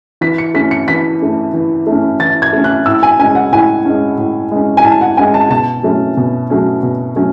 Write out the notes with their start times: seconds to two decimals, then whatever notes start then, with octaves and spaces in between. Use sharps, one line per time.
0.21 E3 B6
0.38 C#7
0.54 A3 C#4 B6
0.71 C#7
0.88 E3 B6
1.21 A3 C#4
1.54 E3
1.87 A3 C#4
2.19 E3 A6
2.42 G#6
2.53 A3 C#4
2.64 F#6
2.86 A2 E6
3.03 G#5
3.19 G#3 C#4 G#5
3.35 F#5
3.52 A2 G#5
3.85 G#3 C#4
4.18 A2
4.52 G#3 C#4
4.77 G#5
4.84 A2 A5
5.01 F#5
5.17 G#3 C#4 G#5
5.34 A5
5.50 B2 A5
5.83 F#3 A3 C#4
6.17 B2
6.50 F#3 A3 C#4
6.83 B2
7.16 F#3 A3 C#4